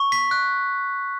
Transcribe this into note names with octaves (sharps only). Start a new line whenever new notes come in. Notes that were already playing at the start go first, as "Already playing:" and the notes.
Already playing: C#6
B6
F#6